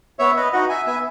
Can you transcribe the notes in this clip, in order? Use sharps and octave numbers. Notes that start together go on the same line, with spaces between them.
B3 C#5 E5
B4 D#5
D#4 F#4 D#5 F#5
E5 G#5
B3 E5 G#5